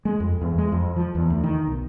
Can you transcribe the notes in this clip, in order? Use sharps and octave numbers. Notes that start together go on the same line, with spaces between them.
G#3
F2
E2
G#3
F2
F3
E2
D2
D#3
B1